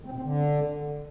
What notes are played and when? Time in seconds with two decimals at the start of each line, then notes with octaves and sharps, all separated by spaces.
0.01 D#3
0.06 C4
0.12 B2
0.17 C4
0.22 D3